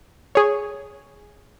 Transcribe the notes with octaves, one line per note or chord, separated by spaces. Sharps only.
G#4 C#5